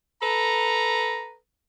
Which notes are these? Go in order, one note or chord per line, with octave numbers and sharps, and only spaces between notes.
A4 B4 A#5